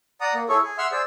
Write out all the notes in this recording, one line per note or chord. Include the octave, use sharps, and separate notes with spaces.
D5 F#5 A#5 D#6
A#3
E4 G#4 A4 C#5 C#6
G#4
E5 F#5 C6 E6 F6
G#4 C5 D5 E6